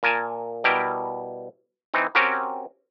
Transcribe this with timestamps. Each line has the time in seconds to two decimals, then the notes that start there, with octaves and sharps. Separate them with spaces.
0.03 A#2 A#4 G#5 A5
0.64 B2 G3 E4 A#4 G5
1.94 E3 C4 D#4
2.15 C4 C#4 F#4 G4 A#4